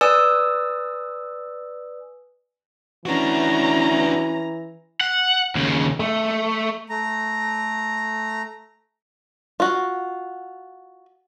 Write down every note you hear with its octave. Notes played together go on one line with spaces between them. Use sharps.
B4 D5 G#5 D#6 E6
E3 C#4 D4 F#4 A#5
F#5
D#2 C#3
A3
A3 A#5
F4 F#4